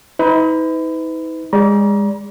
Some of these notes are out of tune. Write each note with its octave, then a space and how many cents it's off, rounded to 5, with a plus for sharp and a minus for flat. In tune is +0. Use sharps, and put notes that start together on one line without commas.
D#4 +45 B4 +30
G#3 -30 D5 -25 A#5 +30